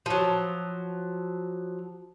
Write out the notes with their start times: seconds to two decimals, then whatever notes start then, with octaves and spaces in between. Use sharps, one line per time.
0.06 F3 F#3